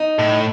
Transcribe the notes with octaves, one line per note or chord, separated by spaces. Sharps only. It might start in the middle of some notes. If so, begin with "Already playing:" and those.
Already playing: D#4
A2